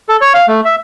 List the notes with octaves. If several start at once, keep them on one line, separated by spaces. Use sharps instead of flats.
A4
C#5
F5
A3
E5